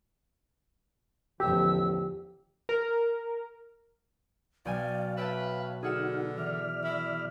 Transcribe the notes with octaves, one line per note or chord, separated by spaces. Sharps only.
A1 E2 D3 F3 G4 E6
A#4
B1 D5 F5 G5 G#5
B4 C#5 E5 G5 A5
D3 D#4 F#4 G#4 F#5 F6 E7
E3 D5 E5 F6
E4